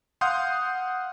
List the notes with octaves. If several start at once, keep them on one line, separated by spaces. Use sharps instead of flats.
F5 F#5 C6 D#6 G6